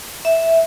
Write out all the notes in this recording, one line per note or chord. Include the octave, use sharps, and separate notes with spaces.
E5